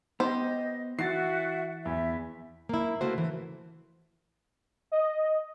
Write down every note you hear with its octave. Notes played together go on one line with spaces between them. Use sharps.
B3 G4 C5 D#5
E3 F#4 E5 F#5 A6 C7
E2 E5
A#3 E4
C#3 A3 A#3 F#4 C5
E3
D#5